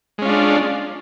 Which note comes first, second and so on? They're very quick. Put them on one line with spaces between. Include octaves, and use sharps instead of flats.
G#3 C#4 F4 D4